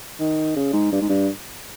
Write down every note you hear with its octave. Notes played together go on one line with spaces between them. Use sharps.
D#3
C#3
G#2
G2
G#2
G2